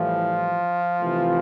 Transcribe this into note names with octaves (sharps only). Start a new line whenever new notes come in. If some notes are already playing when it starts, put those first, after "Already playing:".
Already playing: A2 E3 F3 G3 F4
C3 E3 A3